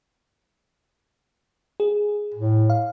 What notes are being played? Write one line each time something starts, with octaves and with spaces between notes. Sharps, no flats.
G#4
A2
F5